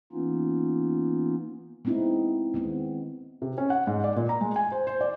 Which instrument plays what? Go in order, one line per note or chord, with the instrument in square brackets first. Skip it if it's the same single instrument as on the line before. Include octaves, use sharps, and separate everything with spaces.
[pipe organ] E3 A#3 B3 C#4 D#4 F4
[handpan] G#3 B3 C4 D#4 E4
D#3 G#3 B3 C4
[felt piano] C3
C#4
F#5
G#2
D5
A#2
A#5
G#3
G#5
C5
C5
D5